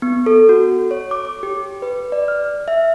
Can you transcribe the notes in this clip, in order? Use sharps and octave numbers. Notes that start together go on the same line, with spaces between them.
B3
A4
F#4
C#5
D6
G4
B4
D5
F6
E5